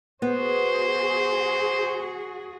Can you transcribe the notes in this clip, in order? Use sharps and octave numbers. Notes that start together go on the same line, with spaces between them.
B3 F#4 G#4 C5